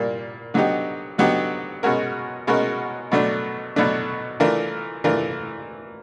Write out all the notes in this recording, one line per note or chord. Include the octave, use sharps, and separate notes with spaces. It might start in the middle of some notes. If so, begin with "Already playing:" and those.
Already playing: A#2 G3 A#3
D3 F#3 B3 D#4 G4
D3 F#3 B3 D#4 G4
B2 G#3 C#4 F#4 A#4
B2 G#3 C#4 F#4 A#4
B2 F#3 A3 D4
B2 F#3 A3 D4
E3 A3 D4 F4 A#4
E3 A3 D4 F4 A#4